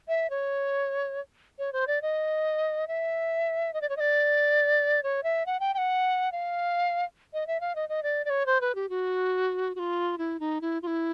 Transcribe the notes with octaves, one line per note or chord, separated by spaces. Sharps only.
E5
C#5
C#5
C5
D5
D#5
E5
D#5
D5
C#5
D#5
D5
C#5
E5
F#5
G5
G5
F#5
F5
D#5
E5
F5
D#5
D#5
D5
D5
C#5
C5
B4
G4
F#4
F#4
F4
E4
D#4
E4
F4
E4